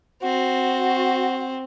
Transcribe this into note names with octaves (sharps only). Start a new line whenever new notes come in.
C4 F#4